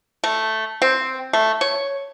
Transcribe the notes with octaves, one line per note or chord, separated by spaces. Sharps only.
A3
C4
A3
C#5